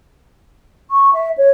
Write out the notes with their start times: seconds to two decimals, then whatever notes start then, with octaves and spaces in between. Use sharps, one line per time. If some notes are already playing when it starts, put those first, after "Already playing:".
0.91 C#6
1.14 E5
1.37 C#5